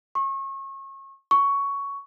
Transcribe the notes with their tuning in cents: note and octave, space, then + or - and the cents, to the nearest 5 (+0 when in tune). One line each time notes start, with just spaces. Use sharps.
C#6 -30
C#6 +10